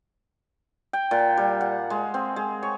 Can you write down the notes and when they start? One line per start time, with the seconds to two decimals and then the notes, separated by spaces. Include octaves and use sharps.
0.93 G5
1.11 A#2
1.37 G3
1.61 F#5
1.90 G#3
2.14 C4
2.36 G#3
2.63 C#5